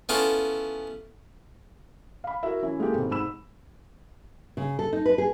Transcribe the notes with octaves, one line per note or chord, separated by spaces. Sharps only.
B3 C#4 E4 F4 A4
F5 B5
E4 F#4 A#4 E5
E3 C#4 E4
G#3 A#3 G4 A4
G#1 B2
G#2 B5 E6 E7
C#3
A4
D#4
B4
G#4